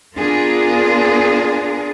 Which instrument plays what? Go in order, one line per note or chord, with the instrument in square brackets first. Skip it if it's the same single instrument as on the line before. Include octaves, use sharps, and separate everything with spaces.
[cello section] B3 D4 F4 G#4 A#4